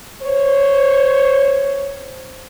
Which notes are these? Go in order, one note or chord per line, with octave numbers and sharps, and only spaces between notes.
C5 C#5